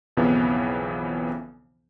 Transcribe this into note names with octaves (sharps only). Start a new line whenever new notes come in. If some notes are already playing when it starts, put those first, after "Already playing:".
B1 F2 C#3 E3 B3